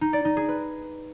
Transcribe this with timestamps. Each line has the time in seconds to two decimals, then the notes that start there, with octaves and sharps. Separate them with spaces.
0.01 D#4
0.13 D5
0.25 D#4
0.37 G#4
0.49 B4